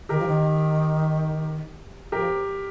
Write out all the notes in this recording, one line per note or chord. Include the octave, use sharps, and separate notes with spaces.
D#3 G4 A#4
F3
D#3
F3 G4 A#4